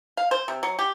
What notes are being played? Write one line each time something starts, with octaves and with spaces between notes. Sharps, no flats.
F5
C5
C3
F#3
G4